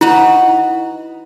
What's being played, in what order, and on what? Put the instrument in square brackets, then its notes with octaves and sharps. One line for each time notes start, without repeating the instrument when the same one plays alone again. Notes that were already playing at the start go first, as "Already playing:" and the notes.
[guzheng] D#4 F#4 B4 [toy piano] E4